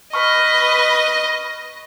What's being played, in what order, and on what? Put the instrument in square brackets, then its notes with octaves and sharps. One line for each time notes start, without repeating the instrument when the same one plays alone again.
[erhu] B4 [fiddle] D#5 [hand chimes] C#6 F6